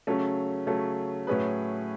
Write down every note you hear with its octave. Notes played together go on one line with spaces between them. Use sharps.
C#3 F#3 A3 C#4
C#3 F#3 A3 C#4
A2 F#3 C#4 G#4 B4